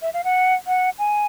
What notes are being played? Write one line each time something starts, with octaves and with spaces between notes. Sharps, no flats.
E5
F5
F#5
F#5
G#5